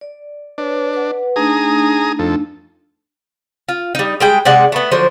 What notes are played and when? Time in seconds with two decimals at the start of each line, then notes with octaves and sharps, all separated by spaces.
0.01 D5
0.58 D4 B4 C#5
0.93 B4 F#5
1.36 A3 D4 D#4 G#4 A#5 D#6
2.19 F2 A4
3.69 F4
3.95 G3 D#4
4.20 G3 G#3 G5
4.45 C3 G#3 D5 F#5
4.72 A3 B3
4.91 D3 F3 F#3 C5